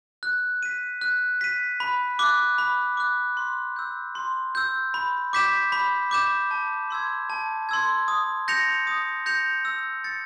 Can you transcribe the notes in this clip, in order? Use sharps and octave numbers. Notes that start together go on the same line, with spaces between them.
F#6
B6 D#7
F#6
B6 D#7
B5
D6 F#6
B5
D6 F#6
C6
E6 G6
C6
E6 G6
B5
D6 G6 B6 E7
B5
D6 G6 B6 E7
A5
C6 E6 G#6
A5
C6 E6 G#6
D#6
G6 A#6 C#7 F7
D#6
G6 A#6 C#7 F7
E6
A6 C#7